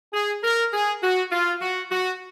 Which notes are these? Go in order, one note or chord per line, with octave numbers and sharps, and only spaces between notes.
G#4
A#4
G#4
F#4
F4
F#4
F#4